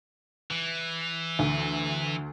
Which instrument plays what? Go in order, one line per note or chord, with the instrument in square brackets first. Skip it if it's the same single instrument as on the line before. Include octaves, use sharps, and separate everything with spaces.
[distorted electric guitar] E3
[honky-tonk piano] D2